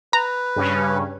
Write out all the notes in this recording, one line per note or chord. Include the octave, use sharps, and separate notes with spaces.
B4 A#5
G2 C#3 C#4